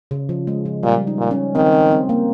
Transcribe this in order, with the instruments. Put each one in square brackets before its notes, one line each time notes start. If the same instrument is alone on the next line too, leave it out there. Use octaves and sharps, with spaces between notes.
[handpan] C#3
F3
G#3
F3
[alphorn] A#2 [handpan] G3
[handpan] D#4
[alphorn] A#2
[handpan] C#4
[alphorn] D#3 [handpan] C4
[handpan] C4
C4
A#3